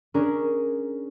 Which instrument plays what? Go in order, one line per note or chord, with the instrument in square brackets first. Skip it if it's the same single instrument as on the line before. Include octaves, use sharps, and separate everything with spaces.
[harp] C#4 D4 G#4 A#4